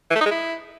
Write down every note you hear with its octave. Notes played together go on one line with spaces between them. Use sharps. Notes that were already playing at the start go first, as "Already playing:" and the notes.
E3
A3
D#4
G#3
E4